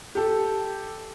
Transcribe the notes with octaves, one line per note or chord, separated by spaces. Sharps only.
G4 A4